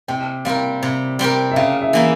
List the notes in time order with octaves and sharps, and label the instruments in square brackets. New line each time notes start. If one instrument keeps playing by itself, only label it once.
[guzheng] C3 [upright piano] G5
[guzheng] G3 C4 G4 A#4 [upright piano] F5
[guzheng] C3
G3 C4 G4 A#4
[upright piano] E5
[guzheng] C#3 [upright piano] F5
[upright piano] E5
[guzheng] E3 A#3 E4